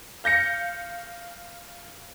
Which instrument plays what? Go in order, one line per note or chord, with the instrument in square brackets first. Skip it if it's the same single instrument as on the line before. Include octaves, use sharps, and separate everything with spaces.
[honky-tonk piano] F5 G6 A#6 C#7